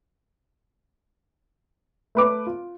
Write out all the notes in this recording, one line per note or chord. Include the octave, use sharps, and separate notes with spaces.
A3 B4 D6
F4